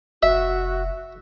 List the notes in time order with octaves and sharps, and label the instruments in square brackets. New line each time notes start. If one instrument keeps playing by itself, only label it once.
[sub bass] F1 [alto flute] F#4 [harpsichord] E5